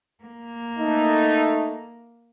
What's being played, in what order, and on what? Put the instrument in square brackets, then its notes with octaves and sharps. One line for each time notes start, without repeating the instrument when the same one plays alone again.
[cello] A#3
[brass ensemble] A3 D#4